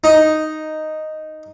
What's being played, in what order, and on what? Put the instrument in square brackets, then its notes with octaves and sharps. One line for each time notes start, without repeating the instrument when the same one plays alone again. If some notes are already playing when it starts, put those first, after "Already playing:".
[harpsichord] D#4